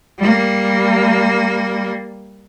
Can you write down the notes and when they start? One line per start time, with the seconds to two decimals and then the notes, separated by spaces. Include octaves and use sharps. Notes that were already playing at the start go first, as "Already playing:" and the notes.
0.19 G3 A#3